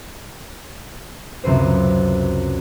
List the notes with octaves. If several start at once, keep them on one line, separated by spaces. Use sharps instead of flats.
C#2 F#2 C3 B4 C5